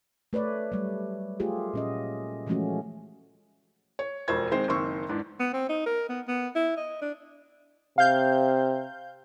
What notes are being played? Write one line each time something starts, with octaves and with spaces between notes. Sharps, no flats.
A3 B4 C#5 D5
F#3 G3 A3
A3 F4 G4 G#4
A#2 C#4 D#5
E3 F3 G#3 A3 C#4 F#4
C#5
E1 F2 C5 C#6 G#6
D#3 G#3 C4 C5
F#1 D#3 C4 C6 C#6 E6
E2 G#2 D4
B3
C4
D#4
A#4
B3
B3
E4
D#5
D4
C3 F5 G6